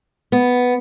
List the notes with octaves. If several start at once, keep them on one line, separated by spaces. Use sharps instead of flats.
B3